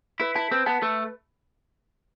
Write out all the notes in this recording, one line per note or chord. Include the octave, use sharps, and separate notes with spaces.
E4 B4
E4 A5
C4 B4
B3 A5
A3 B4